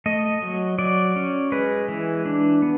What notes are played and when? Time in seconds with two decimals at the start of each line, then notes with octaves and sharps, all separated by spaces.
0.06 A3 D#5
0.42 F#3
0.79 F#3 D5
1.16 C#4
1.52 G#3 B4
1.88 E3
2.26 D4
2.62 B3